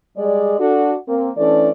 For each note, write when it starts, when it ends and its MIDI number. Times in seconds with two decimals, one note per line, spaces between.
0.18 0.56 55
0.18 0.56 56
0.18 0.56 68
0.18 0.56 74
0.59 0.94 62
0.59 0.94 66
0.59 0.94 69
1.08 1.30 58
1.08 1.30 60
1.37 1.71 52
1.37 1.71 57
1.37 1.71 61
1.37 1.71 62
1.37 1.71 69
1.37 1.71 74